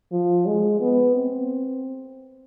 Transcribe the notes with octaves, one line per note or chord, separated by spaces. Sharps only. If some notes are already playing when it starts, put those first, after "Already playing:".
F3
G#3
B3
C4